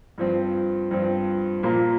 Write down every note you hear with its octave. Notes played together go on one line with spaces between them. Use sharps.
G2 F3 C4
G2 F3 C4
A#2 F3 A#3